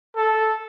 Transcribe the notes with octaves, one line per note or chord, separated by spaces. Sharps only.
A4